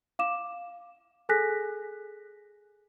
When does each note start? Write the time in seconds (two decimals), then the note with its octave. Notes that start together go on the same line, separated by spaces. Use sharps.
0.19 F5 D6 E7
1.29 G#4 A4 G#5 F#6 A#6 B6